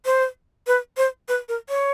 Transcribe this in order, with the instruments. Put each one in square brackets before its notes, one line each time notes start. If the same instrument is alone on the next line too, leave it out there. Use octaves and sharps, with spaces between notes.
[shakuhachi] C5
B4
C5
B4
A#4
C#5